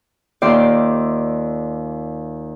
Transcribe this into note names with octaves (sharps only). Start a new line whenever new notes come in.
D#2 F4 D5 E5 G5 C6